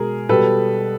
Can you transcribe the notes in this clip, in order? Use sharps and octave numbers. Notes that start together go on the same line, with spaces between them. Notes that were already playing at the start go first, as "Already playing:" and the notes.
Already playing: B2 G#3 G#4 A#4
B2 G3 A4 B4